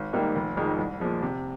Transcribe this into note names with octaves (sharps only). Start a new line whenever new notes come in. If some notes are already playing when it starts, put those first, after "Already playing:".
Already playing: G#1
G#2 D#3 G3 A#3
F1
F2 D#3 G#3 D#4
C2
A#2 F3 G#3
C3